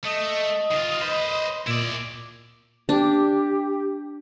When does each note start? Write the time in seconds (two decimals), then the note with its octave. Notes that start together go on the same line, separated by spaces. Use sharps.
0.05 A3 D#5
0.72 D#3 F4
1.02 B4 C5
1.67 A#2 E4 D5
2.89 D4 G4